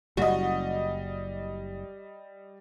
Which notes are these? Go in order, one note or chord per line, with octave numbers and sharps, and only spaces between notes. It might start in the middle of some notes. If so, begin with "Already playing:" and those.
F#1 G3 F#4 D#5